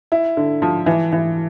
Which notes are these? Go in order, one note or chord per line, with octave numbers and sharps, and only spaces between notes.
E4
D3
F3
E3
E3